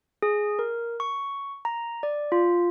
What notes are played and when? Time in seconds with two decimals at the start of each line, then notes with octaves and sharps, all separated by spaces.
0.22 G#4
0.59 A#4
1.00 C#6
1.65 A#5
2.03 D5
2.32 F4